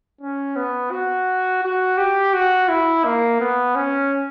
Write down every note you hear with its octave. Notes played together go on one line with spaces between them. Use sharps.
C#4
B3
F#4
F#4
G4
F#4
E4
A#3
B3
C#4